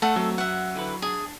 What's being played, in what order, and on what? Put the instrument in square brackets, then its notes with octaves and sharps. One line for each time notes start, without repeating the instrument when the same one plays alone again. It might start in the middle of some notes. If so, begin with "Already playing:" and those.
[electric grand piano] A3 [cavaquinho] A4 [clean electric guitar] F#5
[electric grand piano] F#3 [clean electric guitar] A3 C4 E5
[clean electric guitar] F#2 [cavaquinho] E5 F#5
[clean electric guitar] D3 E4 B4
[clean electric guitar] D4 [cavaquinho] G#4